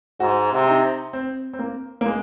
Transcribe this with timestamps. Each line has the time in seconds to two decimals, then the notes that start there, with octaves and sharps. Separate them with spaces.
0.20 G#2 F#4
0.52 C3
0.68 D#4
1.13 C4
1.53 C4
1.59 A#3
2.01 A#3
2.06 G#3